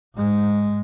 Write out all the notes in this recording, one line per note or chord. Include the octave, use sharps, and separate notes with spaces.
G#2 G#3